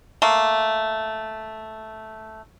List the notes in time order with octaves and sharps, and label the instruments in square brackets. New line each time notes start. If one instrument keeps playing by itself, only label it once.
[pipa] A3 A#3